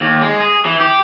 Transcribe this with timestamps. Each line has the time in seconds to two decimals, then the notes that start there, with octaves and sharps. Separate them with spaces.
0.01 D#2
0.21 G#3
0.40 G#4
0.66 E3
0.80 G4